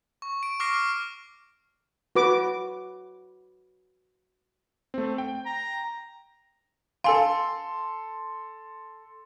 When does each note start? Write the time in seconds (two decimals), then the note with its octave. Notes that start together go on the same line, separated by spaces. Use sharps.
0.22 C#6
0.43 D7
0.60 C#6 D6 F6 A#6 C7 D7
0.74 F6
2.16 F#4 B4 D6
4.94 A3 C4
5.18 G5
5.45 A#5
7.04 A4 F5 G#5 C6